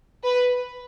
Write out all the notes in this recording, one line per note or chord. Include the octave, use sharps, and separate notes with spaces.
B4